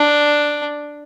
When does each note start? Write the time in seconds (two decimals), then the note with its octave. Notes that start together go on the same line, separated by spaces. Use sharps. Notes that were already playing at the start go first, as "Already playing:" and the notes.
Already playing: D4